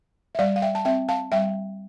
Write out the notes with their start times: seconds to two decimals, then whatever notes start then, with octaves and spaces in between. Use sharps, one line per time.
0.35 E5
0.39 G3 D5 F5
0.56 F5
0.62 E5 G5
0.75 A5
0.85 C4 E5 G5
1.09 F5 A5
1.32 G3 E5 G5